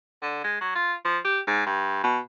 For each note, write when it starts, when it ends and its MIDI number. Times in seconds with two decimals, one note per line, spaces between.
0.22 0.44 50
0.44 0.56 56
0.61 0.73 54
0.75 0.93 65
1.05 1.18 53
1.24 1.40 67
1.47 1.62 44
1.66 2.00 43
2.03 2.18 47